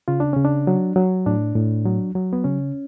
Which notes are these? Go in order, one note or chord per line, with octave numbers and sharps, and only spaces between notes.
C#3 F4
D4
C#3 C#4
D4
F#3
F#3
A2 D4
A2
F#3
F#3
B3
C#3 C#4